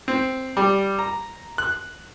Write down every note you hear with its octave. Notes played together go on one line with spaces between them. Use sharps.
C4
G3
A#5
F#6